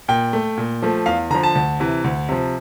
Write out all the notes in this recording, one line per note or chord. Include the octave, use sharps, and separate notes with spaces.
A#2 G5
A3
A#2
F3 A3
E2 F5
D3 F3 A#5
A5
D2
C3 E3
D2
C3 F3